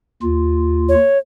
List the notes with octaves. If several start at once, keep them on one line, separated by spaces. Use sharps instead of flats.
D#2 F4
C#5